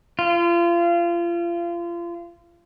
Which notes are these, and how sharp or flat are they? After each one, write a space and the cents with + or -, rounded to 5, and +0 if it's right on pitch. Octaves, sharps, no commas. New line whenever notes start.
F4 -30